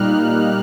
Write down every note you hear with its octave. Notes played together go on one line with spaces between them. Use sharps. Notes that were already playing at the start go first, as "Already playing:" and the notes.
Already playing: A#2 G3 A#3 D#4 F6 F#6